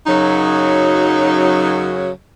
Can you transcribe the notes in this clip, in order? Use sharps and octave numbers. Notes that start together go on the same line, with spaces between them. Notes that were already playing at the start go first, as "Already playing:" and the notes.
F#2 C#3 F#3 D#4